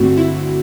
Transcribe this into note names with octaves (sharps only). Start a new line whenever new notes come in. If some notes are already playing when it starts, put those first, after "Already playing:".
Already playing: G2 D3 A3 C4 F#4
E4